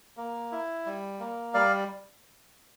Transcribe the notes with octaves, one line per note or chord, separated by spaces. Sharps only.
A#3
E4
G3
A#3
G3 D5 F5